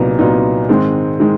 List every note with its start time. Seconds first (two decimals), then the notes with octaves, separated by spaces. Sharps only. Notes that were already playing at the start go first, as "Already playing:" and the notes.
Already playing: C2 A#2 F#3 B3 D#4
0.19 C2 A#2 F#3 B3 D#4
0.69 G#2 D#3 G#3 C4
1.20 D#3 G#3